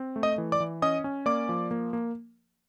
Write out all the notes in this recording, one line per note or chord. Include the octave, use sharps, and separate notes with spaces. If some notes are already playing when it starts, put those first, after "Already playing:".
Already playing: C4
A3
D#5 D#6
E3
D5 D6
E3
C#4 D#5 D#6
C#4
A#3 D5 D6
F3
A#3
A#3